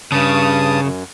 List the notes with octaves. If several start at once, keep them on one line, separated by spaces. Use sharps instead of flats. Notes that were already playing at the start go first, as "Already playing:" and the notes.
G2 C#3 A5 D#6
F#2